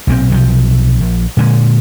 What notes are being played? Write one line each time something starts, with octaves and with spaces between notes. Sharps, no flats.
B1 A#2 D3 C4
B1 C3 F3
A#1
A#2 D3 E3 G#3